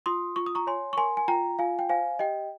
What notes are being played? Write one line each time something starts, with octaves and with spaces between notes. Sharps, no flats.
F4 C6 D#6
F4 C#6
D#6
A#5 C#6
C#5 G#5 C6
C#6
A#4 G#5 C6
G#5
F4 G5 A#5
F4 F5 G#5
G5
C5 F5 G#5
G4 D#5 G5